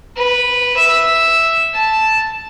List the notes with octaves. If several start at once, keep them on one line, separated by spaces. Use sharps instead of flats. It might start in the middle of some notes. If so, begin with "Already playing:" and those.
B4
E5
A5